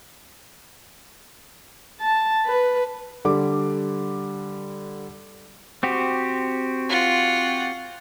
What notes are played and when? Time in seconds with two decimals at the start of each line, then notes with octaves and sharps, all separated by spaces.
2.00 A5
2.46 B4
3.25 D3 G3 D6
5.83 C4 F#4 G4
6.89 F4 F#5